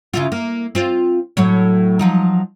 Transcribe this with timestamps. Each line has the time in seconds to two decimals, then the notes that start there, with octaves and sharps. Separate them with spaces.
0.13 C#3 E4 F4
0.32 A#3
0.75 C4 F4
1.37 A2 F#3 C#5
1.99 F3 F#3 D#4